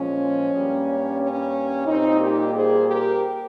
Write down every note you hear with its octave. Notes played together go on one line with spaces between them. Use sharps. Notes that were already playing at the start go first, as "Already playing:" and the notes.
Already playing: A#2 F3 G#3 C#4
G2 G3 A#3
C#4
A#2 G3 A#3 C4 D#4
G4 A#4
G#4 C5
G4 A#4